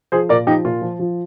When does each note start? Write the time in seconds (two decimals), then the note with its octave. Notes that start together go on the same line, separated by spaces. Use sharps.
0.12 F3 G#4 C5
0.29 A#2 A#4 D5
0.47 F3 D#4 G4
0.65 A#2 F4
0.82 F3
0.99 F3